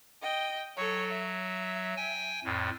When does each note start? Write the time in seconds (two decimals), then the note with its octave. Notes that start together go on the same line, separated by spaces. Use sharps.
0.22 D#5 G5
0.77 F#3 A4 C#5
1.12 E5
1.97 G5 G#5
2.44 F2 A2